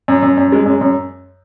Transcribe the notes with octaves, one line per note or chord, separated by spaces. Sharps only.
F#2
F#2
F#2
G#3
F#2
F#2